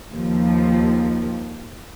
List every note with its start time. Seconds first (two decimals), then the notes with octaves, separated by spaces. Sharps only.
0.10 D#2 F3